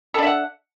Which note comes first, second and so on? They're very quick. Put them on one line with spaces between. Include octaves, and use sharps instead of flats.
A4 D4 E5 F#5